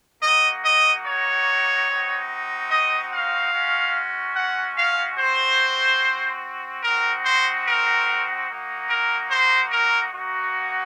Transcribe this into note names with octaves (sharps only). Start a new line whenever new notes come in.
A#3 D#4 F#4 D#5
D#5
C#5
C4 D#4 F#4
D#5
F5
G#3 C#4 F#4
F#5
F5
C4 F#4 C5
C4 D#4 F#4 A#4
C5
A#4
A#3 D#4 F#4
A#4
C5
A#4
A#3 D#4 F#4